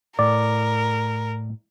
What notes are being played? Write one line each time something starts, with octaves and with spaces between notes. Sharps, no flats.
A2 A#4 D5